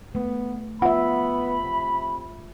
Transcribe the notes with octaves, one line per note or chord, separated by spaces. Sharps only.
A3 B3
B3 F4 E5 F#5 B5
C3